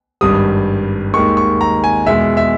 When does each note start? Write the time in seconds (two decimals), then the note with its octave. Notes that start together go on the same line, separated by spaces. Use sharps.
0.21 G#1 G2 G3 D#6
1.14 D#2 D#3 G#3 C#6
1.37 C#6
1.61 A#5
1.84 G#5
2.06 E2 B2 G#3 E5
2.37 E5